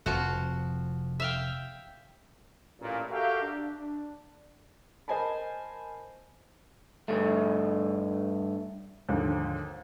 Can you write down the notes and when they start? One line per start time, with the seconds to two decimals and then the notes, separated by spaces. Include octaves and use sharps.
0.06 F1 F2 F3 F#4 F#5
1.20 E5 F5 G5
2.81 A1 A#2
3.11 F#4 G4 A4 A#4 E5 F5
3.43 D4
5.08 A#4 C5 D#5 G#5 A5 B5
7.08 G2 A3
9.09 D#2 G#2 D3 F3 D4